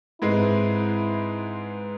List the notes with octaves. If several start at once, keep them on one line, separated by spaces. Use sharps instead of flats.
G#2 G#3 C4 E4 G#4 B4